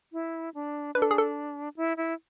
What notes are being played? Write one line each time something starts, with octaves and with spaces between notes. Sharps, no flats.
E4
D4
D4 B4
A4
G#4
A4
E4
E4